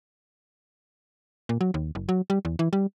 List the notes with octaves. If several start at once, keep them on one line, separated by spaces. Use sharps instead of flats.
A#2
F#3
D#2
F#1
F#3
G3
E2
E3
G3